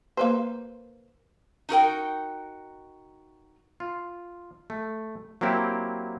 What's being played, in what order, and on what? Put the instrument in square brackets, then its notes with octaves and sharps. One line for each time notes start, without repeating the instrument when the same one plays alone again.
[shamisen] A#3 B4 C5
[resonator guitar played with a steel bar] D#4 F#4 A#4 G5
[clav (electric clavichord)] F4
A3
F#3 A#3 C4 E4 G4